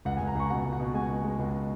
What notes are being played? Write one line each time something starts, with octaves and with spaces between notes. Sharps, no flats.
C#2 F#5
C#2 G#5
A#5
C#2 C#6
B2 F#5
C#2
F#5
B2
G#3 G#5
C#2
G#3
C#2